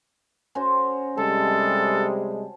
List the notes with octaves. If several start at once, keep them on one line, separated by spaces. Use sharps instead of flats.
C#4 F#4 C5
C3 G3 G#3 A4 A5